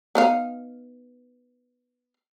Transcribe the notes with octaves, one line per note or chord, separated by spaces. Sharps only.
B3 D#4 F5